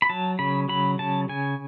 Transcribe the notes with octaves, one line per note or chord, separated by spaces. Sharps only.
B5
F#3 A5
C#3 B5
F#3 B5
C#3 A5
C#3 G#5